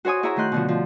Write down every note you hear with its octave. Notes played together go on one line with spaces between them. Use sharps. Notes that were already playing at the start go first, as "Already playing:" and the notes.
F#4 C5 C#5 G#5 D#6
E4 G#4 C#5 E5 A#5
D#3 A3 D#5 C6 F#6 G6
B2 D3 F3
F3